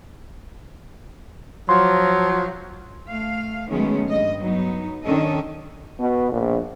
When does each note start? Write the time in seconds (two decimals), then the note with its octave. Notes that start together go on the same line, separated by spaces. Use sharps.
1.69 F3 F#3 C6
3.09 A3 F5
3.69 D#3 F#3 G#3 A3 B3 C#4
4.08 G2 D#5
4.39 F#3 B3 D#4
5.03 D#3 C#4 D4 A4 D#5
6.00 B2
6.32 A#1